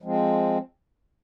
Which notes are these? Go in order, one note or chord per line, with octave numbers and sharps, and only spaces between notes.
F3 G#3 C4